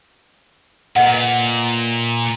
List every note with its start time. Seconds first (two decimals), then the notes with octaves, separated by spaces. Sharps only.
0.96 A#2 B4 D#5 F#5